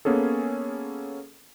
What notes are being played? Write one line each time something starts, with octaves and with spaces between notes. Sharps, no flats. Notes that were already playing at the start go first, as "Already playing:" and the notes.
A#3 B3 C#4 G#4 A4